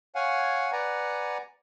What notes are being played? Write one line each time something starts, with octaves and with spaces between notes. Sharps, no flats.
C#5 F5 F#5 G#5
B4 D5 F#5 G#5 A#5